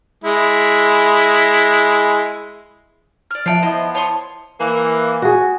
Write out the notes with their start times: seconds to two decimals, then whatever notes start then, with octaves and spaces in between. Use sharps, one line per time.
0.24 G#3 E4
3.31 D5 F6
3.46 F3 C#5 E5 G5 A5 F#6 C7
3.63 F3 B3 E4 C5 D#5
3.95 C#5 A5 C6 D#6
4.60 E3 A#3
5.22 F#4 G#4